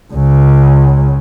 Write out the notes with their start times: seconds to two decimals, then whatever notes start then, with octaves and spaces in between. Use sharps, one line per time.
0.13 C#2 C#3